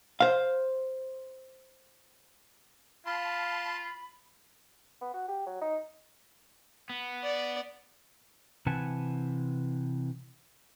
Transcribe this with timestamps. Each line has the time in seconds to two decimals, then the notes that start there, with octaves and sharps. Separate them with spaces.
0.20 C5 F5
3.06 F4 F5 A5 B5 C6
5.01 B3
5.14 F#4
5.28 G4
5.46 F#3
5.61 D#4
6.89 B3
7.23 D5
8.66 C3 E3 B4 F#5 G#5 A5